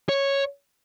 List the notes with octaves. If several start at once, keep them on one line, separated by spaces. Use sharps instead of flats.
C#5